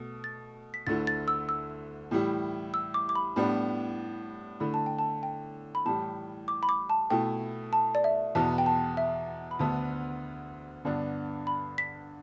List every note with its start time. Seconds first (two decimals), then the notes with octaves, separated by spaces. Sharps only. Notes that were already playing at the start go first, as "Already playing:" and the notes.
Already playing: B2 A3
0.24 A6
0.74 B6
0.87 D2 D3 A3 E4 A6
1.07 A6
1.28 E6
1.49 E6
2.11 A2 E3 G3 E4
2.74 E6
2.94 D6
3.09 D6
3.15 B5
3.36 A2 G3 B3 D4 B5
4.60 D3 A3 E4 B5
4.74 A5
4.86 G5
4.99 A5
5.23 G5
5.75 B5
5.85 A2 E3 G3 A5
6.48 D6
6.63 B5
6.69 D6
6.90 A5
7.10 B2 A3 E4 G5
7.73 A5
7.95 D5
8.04 E5
8.35 E2 B2 B3 A5
8.58 G5
8.66 A5
8.97 E5
9.51 B5
9.59 D2 D3 B3 A5
10.85 G2 D3 B3 D4
11.47 B5
11.78 B6